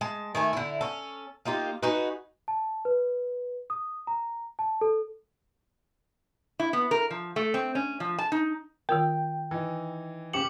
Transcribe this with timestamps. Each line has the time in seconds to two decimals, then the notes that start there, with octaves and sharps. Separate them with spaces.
0.01 G#3 A5
0.35 D#3 A3 G#5
0.53 D3 E4
0.81 C#4 A4
1.45 A#3 D#4 F4 G4
1.83 D#4 F#4 G#4 B4
2.48 A5
2.85 B4
3.70 D#6
4.07 A#5
4.59 A5
4.81 A4
6.59 E4
6.73 B3
6.91 A#4
7.10 F3
7.36 A3
7.54 C4
7.75 C#4
8.00 F3
8.19 A5
8.32 D#4
8.89 D#3 F4 A#4 G5
9.51 E3 D#4
10.33 C#3 C#4 G4 D6 C#7 F#7